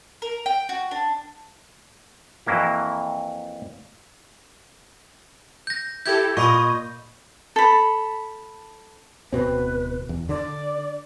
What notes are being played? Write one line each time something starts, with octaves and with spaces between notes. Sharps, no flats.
A#4
G5
F#4
D4
F2 E3 F#3 A#3 E4
G6 A#6
E4 G4 A4 G6 G#6
A#2 D#5 B5 C#6 D#6
A4 B5
D1 B2 C4 B4
E2
D3 D5